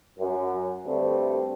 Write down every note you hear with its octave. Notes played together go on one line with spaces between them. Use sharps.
F#2
D2 G2 D3 G3 A3 C4